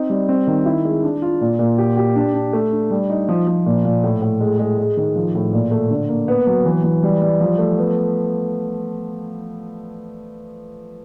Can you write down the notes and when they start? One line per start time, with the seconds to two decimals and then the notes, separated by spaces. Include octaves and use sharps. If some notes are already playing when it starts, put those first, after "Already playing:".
Already playing: C4 D#4
0.10 G3
0.29 C4
0.47 D#3
0.66 E4
0.85 G#3
1.03 D4
1.22 F4
1.41 A#2
1.59 A#2
1.78 G4
1.97 G4
2.16 D4
2.34 D4
2.53 A3
2.72 D4
2.91 G3
3.10 D#4
3.29 F3
3.47 F3
3.66 A#2
3.85 A#2
4.04 A2
4.22 A2
4.40 G#3
4.59 G#3
4.78 G#3
4.97 D#3
5.16 F3
5.35 A2
5.53 A#2
5.71 A3
5.90 D3
6.09 A#3
6.28 B3
6.47 F#3
6.66 E3
6.84 E3
7.03 G3
7.22 G3
7.41 F3
7.59 A3
7.78 B3